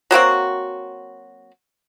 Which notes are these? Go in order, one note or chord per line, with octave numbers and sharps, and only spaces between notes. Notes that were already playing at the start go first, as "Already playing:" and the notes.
F#3 A#3 C4 F#4